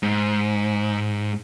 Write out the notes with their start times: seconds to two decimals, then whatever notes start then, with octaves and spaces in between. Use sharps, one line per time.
0.03 G#2